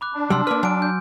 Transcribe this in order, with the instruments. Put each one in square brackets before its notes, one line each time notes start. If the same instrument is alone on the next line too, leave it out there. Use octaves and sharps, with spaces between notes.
[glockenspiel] B5 D6 F#6
[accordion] D4
[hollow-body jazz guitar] C3 F#3 G3 [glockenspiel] C6 E6 F6
[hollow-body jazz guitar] A#3 B4 [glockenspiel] D6 F6
[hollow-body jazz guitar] F#3 [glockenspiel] G#5 D7
[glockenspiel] G6